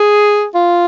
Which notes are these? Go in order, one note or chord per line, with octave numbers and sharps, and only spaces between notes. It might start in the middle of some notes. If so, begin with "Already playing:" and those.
Already playing: G#4
F4